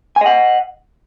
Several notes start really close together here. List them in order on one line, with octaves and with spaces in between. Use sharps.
G#5 D#5 F#5